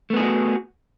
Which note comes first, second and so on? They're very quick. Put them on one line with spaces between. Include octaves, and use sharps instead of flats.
A3 B3 G#4 E4 F#4